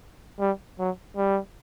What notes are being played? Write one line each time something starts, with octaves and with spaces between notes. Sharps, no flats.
G3
F#3
G3